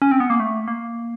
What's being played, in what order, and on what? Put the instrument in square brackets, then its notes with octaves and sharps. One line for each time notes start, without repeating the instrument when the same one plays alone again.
[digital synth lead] C#4
C4
B3
A#3
A3
A#3